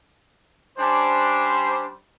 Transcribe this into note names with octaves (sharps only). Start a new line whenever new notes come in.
G3 C#4 D4 C5